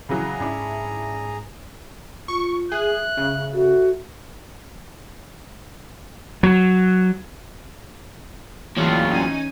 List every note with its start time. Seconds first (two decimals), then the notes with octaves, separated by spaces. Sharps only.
0.09 C#3 E3 F#3 G#4 A#5
0.40 G#2 C#4 D4 E4
2.28 F4 C#6
2.72 G#4 E5 F#6
3.17 C#3
3.54 F#4 A4 E5
6.43 F#3
8.77 A2 C#3 E3 F#3 A#3 F4
9.10 C#4 D#4 G#5